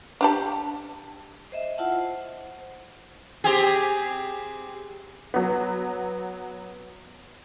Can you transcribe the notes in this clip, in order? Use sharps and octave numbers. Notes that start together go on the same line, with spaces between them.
D4 G4 A5
C5 D#5 E5
E4 F4 F#5 A5
C5
C4 G4 G#4
F#3 B3